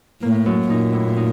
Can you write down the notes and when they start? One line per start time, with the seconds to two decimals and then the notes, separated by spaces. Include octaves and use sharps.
0.22 A2 A#3
0.46 F#2
0.70 A#2 D#4
0.93 A2
1.17 D#4